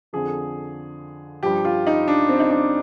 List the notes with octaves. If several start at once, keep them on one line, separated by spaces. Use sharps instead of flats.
F2 D3 F3 G#4
G2 F3 G4
F4
D#4
D4
C4
D#4
D4